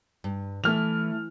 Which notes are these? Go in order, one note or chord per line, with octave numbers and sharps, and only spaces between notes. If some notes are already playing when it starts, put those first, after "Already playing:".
G2
E3 A3 F6 F7